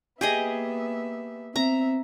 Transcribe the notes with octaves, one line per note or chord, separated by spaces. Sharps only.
A#3 B3 G4 G#4 D#5 E5
B3 C4 E5 A#5